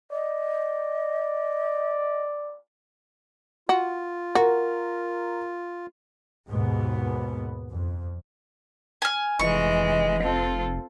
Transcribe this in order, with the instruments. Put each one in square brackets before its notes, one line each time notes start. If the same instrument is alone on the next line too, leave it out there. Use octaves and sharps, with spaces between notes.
[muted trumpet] D5 [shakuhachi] D#5
[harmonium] F4 [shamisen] F#4
[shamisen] F#4 [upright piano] A#4
[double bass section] D#2 G#2 B2 B3
F2
[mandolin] G#5 F6
[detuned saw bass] F1 [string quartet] E3 G#3 [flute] D#5 [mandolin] C#6
[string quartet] C4 F4 A4